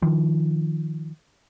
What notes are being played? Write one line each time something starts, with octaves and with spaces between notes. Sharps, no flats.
D#3 F3